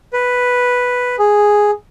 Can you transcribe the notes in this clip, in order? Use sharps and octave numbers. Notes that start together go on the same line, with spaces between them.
B4
G#4